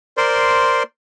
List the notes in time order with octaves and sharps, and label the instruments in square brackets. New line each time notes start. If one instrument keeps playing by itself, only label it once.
[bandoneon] A#4 C5 D5 C6